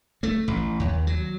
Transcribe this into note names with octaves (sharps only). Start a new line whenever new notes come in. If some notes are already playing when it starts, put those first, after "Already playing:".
A3
A1
D#2
F#3